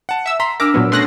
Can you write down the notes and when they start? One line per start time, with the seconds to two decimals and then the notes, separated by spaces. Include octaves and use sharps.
0.09 F#5 A5
0.26 E5 E6
0.40 A#5 C6 B6
0.60 D4 A#4 D6 E6 F6 A#6
0.74 A#2 F#3 B3
0.92 B2 A3 C#4 C6 F#6 A#6